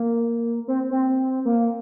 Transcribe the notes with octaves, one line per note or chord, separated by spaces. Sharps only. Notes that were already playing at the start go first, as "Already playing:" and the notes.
Already playing: A#3
C4
C4
A#3